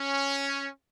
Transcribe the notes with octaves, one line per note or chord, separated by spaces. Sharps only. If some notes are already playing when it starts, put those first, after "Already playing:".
Already playing: C#4